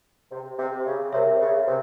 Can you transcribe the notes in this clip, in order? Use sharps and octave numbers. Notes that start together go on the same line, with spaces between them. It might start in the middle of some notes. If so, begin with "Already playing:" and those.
C3
C3
C#3
C3 A#4 C#5 E5
C#3
C3